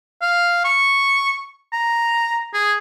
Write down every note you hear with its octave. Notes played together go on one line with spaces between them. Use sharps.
F5
C#6
A#5
G#4